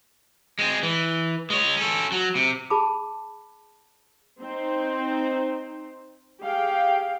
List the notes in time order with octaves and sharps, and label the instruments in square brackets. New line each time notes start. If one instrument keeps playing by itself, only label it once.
[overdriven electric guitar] G#3 C4
E3
G#3 C#5
C#4 A4
F#3
C3
[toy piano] G#4 A5 B5 D6
[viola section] C4 D#4 C5
G4 G#4 F5 G5